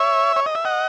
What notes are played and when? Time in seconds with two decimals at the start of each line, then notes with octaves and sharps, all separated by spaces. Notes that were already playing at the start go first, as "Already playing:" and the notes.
Already playing: C#5 E5
0.36 C#5
0.46 D#5
0.55 E5
0.65 D#5 F#5